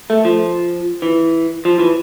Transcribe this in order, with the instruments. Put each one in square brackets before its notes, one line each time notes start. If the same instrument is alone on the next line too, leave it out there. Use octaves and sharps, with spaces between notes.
[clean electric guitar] A3
F3
E3
F3
E3